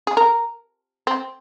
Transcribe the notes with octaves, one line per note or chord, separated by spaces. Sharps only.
G#4
A#4
C4